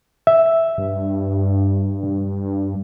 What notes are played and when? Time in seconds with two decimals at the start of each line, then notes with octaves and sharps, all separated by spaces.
0.27 E5
0.78 G2